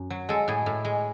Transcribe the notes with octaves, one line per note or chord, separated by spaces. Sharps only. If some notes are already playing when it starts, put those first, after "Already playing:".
Already playing: F#2
F#3
G#3 A4
A2 G#4
A2
G#3